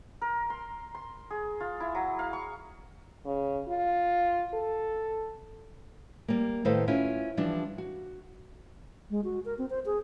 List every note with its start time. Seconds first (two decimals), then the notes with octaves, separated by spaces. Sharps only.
0.21 A#4
0.50 C6
0.95 C6
1.30 G#4
1.60 F4
1.80 E4
1.95 F#3
2.19 F5
2.33 C#6
3.25 C#3
3.68 F4
4.54 A4
6.28 G3 A#3
6.65 A2 D#3 A4 B4 C5 F5
6.88 C#4 E4 F4
7.37 E3 F3 G3 D4
7.78 F#4
9.10 G#3
9.24 F#4
9.45 A#4
9.58 C4
9.70 C5
9.86 G#4